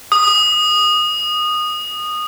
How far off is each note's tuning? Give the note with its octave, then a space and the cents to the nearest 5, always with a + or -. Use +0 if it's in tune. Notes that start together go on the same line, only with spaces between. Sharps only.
D#6 -15